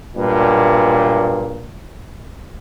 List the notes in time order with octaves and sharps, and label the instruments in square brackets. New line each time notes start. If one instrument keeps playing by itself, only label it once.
[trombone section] B1 G2 A#2